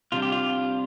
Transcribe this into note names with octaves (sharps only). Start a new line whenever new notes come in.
C3 G3 D4 F4
G4
F4